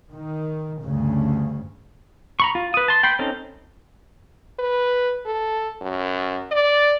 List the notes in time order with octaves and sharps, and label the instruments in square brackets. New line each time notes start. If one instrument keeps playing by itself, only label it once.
[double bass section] D#3
D2 G2 C#3
[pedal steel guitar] A#5 B5 C#6
F4
B4 D#6
A5 C6
G5 B5 C6
C4 C#4 D#4 A4
[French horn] B4
A4
F#2
D5